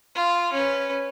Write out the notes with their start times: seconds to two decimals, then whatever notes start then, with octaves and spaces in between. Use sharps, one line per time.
0.15 F4
0.53 C#4 B4